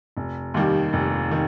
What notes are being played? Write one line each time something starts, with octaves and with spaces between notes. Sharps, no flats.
F1
D#2 D#3 G3
F1
D#3